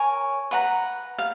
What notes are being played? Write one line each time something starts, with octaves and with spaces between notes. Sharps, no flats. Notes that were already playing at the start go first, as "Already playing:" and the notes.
Already playing: A#4 C#5 G#5
B4 F#5 A#5
F5